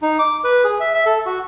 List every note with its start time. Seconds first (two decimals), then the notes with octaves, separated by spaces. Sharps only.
0.02 D#4
0.19 D6
0.44 B4
0.64 G#4
0.80 E5
0.94 E5
1.06 A4
1.26 F#4